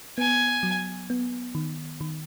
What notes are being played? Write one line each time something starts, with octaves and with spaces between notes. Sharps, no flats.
B3 G#5
F#3
B3
D#3
D#3